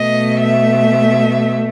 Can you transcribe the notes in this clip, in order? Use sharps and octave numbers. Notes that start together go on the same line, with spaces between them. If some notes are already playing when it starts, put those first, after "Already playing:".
Already playing: B2 A3 D#5
E5